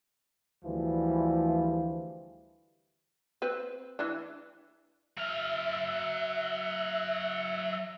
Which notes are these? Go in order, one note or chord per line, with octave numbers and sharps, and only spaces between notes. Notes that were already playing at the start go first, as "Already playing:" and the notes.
D2 E3 F3 G3
C4 B4
E3 D4
F#3 E5 F5